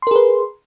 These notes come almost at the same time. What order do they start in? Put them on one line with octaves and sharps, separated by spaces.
C6 A#4 G#4 B4